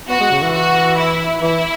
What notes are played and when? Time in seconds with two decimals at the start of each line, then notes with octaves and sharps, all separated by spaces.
0.09 B3 F#4
0.20 G#3
0.31 C#3
0.42 E3
0.54 F#4
0.97 E4
1.42 E3 E4